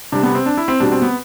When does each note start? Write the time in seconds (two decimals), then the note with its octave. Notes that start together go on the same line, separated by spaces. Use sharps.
0.12 C3 G3 D4
0.23 B3
0.35 C4
0.46 D4
0.57 E4
0.68 C4
0.80 B2 G3 D4
0.92 C4
1.02 B3